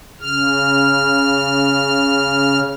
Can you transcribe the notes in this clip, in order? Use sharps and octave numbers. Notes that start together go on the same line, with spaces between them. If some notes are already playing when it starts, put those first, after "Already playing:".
C#3 F6